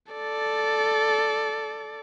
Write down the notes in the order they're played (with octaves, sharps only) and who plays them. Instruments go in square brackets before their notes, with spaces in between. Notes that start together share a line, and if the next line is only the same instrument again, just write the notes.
[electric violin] A4 D5